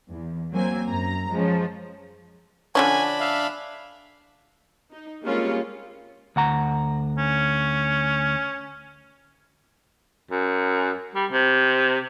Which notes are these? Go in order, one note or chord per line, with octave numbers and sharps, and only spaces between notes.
E2
F#3 A#3 C4 G#5
F#2 A#5
F3 G#3 C#4
D3 F3 C#4 D4 G#5 B5
E5 F5
D#4
G3 G#3 A#3 C4 C#4 F4
D2 F#5 A#5
C#4
F#2
G3
C3